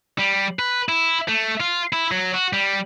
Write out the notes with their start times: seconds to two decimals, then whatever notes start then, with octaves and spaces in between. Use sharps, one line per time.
0.19 G3
0.59 B4
0.89 E4
1.28 A3
1.60 F4
1.93 E4
2.11 F#3
2.34 F#4
2.53 G3